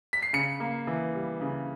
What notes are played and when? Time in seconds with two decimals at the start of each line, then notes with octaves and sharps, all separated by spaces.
0.13 B6
0.22 C7
0.33 C#3 C#7
0.60 A#3
0.87 E3
1.15 G3
1.41 C#3